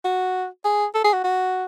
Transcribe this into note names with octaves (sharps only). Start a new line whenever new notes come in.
F#4
G#4
A4
G#4
F#4
F#4